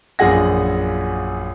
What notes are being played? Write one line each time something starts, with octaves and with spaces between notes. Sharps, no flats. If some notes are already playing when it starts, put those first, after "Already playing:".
A#1 F#2 F4 G#4 F#5 A#6